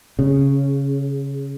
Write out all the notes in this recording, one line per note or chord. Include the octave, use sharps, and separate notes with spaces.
C#3